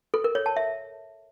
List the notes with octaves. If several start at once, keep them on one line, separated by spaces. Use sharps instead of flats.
A4
A#4
C#5
A5
E5